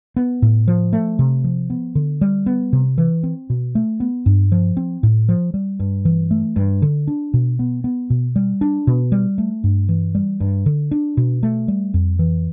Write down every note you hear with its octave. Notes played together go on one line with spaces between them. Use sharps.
B3
A2
F3
A3
C3
F3
B3
D3
G3
B3
C3
E3
C4
B2
A3
B3
G2
F3
C4
A2
F3
G3
G2
E3
A3
G2
D3
D4
B2
B3
B3
B2
G3
D4
B2
G3
A3
G2
E3
G3
G2
D3
D4
B2
A3
G3
F2
E3